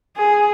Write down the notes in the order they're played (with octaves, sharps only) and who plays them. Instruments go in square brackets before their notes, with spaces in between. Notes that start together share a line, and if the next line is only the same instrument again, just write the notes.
[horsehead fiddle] G#4